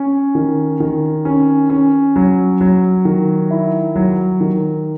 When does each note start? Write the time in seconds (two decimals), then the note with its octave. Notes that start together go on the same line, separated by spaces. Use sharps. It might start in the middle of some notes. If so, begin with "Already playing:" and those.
Already playing: C#4
0.35 D#3
0.80 D#3
1.25 C#4
1.70 C#4
2.16 F#3
2.61 F#3
3.05 D#3
3.51 E4
3.96 F#3
4.40 D#3